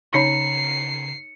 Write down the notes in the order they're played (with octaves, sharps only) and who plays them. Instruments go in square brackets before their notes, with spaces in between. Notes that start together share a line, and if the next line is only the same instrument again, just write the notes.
[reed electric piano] C#3 A#5 [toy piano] D#4 C#5 B5 [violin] C7 [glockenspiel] C#7